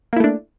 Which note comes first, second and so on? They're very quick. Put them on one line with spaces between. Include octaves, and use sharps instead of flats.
A#3 E4 A3 D4